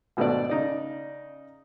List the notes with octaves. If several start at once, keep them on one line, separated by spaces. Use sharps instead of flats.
G#1 B2 A3 D4 D5
C#3 D#4 D5